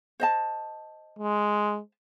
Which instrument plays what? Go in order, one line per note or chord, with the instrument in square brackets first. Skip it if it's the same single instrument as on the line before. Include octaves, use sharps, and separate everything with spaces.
[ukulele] C5 D#5 A5
[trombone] G#3